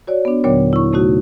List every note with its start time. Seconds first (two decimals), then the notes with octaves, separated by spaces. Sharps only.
0.07 F#4 C#5 D5
0.25 B3 D4
0.44 D#2 A#2 D3 F#3 B3 C#5
0.73 E4 C#6
0.93 C3 A3 D#4 F#4